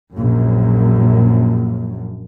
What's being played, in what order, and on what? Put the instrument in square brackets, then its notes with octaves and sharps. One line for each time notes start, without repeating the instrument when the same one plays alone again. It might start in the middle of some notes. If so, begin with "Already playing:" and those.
[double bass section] A#1 F#2